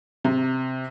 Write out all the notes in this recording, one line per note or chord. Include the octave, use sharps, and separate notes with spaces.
C3